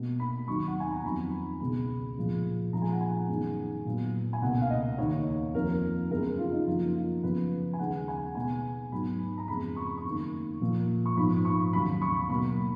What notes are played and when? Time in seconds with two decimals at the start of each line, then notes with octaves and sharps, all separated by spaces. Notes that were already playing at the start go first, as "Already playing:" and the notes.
Already playing: B2 A#3
0.20 B5
0.48 D#2 D#3 F#3 C#6
0.68 F#5
0.80 G#5
0.92 A#5
1.04 F2 D#3 F#3 B3 B5
1.60 C#2 B2 G#3 B3 B5
2.16 A#2 F3 G#3 B3
2.72 A#2 F3 G#3 A#5
2.82 G#5
2.92 F#5
3.01 G#5
3.29 F#2 D#3 G#3 B3
3.85 A#2 F#3 B3
4.33 G#5
4.42 C#2 B2 A#3 F#5
4.61 F5
4.70 D#5
4.98 D#2 D#3 A#3 C#5
5.54 F2 F3 A#3 A#4
6.10 F#2 C#3 G#3 B3 A#4
6.39 F4
6.52 D#4
6.66 F#2 F3 A#3 F4
6.96 F4
7.23 F#2 C#3 F3 B3 B4
7.73 G#5
7.79 D#2 C#3 G#3 F#5
8.08 G#5
8.35 B2 G#3 B3 G#5
8.92 G#2 F#3 B3 B5
9.38 A#5
9.48 F2 C#3 G#3 B3 B5
9.76 C#6
9.97 C#6
10.04 F#2 D#3 A#3
10.61 A#2 F3 A#3
11.06 C#6
11.17 G#2 F3 B3 B5
11.45 C#6
11.73 D#2 C#3 F#3 B5
12.02 C#6
12.29 B2 F#3 A#3 B5